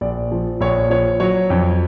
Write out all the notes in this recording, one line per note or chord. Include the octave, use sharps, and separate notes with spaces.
A#1 D5
F3
A#1 C#5
F3 C#5
F#3 C#5
F2